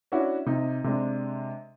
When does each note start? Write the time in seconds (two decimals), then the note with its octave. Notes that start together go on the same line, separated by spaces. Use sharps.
0.12 C#4 D4 E4 F#4
0.46 C3 D#4
0.84 C3 G#3 D4